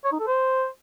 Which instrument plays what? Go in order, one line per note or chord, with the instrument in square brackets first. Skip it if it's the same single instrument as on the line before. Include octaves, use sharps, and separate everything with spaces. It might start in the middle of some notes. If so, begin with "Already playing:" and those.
[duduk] C#5
D#4
A4
C5